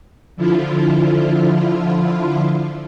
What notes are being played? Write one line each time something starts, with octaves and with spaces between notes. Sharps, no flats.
D3 F3 E4 F4